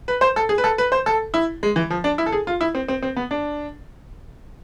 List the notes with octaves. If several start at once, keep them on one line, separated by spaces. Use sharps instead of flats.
B4
C5
A4
G#4
B4
A4
B4
C5
A4
E4
G#3
E3
F3
D4
E4
A4
G#4
F4
E4
C4
C4
C4
B3
D4